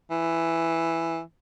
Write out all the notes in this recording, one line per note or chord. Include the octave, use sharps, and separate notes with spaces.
E3